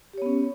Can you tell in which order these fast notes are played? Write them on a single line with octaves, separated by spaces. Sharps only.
G4 C#5 B3 C#4